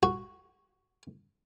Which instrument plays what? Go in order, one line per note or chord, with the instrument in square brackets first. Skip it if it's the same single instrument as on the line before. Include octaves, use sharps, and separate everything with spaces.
[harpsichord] F#4